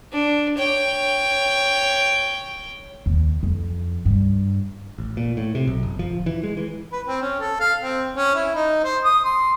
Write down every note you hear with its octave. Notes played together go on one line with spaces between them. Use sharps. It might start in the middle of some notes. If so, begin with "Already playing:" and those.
D4
C#5 G5
D#2
F2
G2
A1
A#2
A2
C3
B1
F#1
F3
D1
E3
G#3
E3
B4
C4
C#4
A4
F5
C4
C#4
E4
D#4
C5
D#6
C6